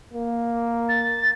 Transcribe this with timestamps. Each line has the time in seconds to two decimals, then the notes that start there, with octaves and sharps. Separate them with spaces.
0.13 A#3
0.89 A6